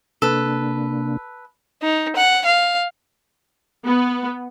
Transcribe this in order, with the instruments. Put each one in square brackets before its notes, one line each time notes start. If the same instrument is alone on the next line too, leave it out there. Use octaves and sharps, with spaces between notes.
[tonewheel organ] C3 A#3 D4 [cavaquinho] A4 B4
[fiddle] D#4
F#5
F5
[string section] B3